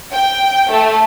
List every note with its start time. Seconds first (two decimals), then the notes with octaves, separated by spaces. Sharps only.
0.12 G5
0.70 A3